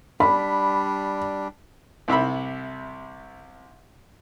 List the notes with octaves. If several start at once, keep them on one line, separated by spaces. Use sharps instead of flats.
G3 D4 B5
C2 C3 E5 B5